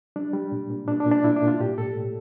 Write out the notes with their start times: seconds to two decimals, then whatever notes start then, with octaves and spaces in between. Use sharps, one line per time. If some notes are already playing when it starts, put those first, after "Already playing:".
0.16 G3 D4
0.33 G3
0.52 A#2
0.70 A#2
0.88 A#2 D4
1.00 D4
1.06 A#2
1.12 D4
1.24 A#2 E4
1.36 D4
1.42 A#2
1.48 F4
1.60 A2 G4
1.78 A2 A4
1.96 A2